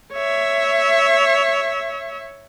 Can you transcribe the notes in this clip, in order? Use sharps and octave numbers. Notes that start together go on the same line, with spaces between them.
C#5 E5